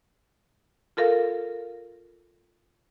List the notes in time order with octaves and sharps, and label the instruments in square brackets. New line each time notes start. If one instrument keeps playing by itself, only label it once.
[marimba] F4 A4 A#4 F5